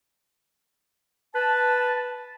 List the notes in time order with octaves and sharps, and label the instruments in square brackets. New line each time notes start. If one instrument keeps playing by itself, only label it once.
[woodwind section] B4 A5